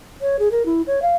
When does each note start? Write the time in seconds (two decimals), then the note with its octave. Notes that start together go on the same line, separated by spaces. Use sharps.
0.21 C#5
0.39 G#4
0.51 A#4
0.66 E4
0.87 C#5
1.02 F5